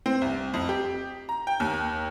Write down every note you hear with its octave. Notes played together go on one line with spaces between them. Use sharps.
C4
C2
F2
G4
A#5
G5
D#2